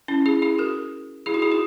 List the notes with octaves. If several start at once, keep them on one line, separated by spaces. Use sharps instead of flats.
C#4 E4
E4 G#4
E4 G#4
F#4 A#4
E4 G#4
D#4 F#4
E4 G#4
D#4 F#4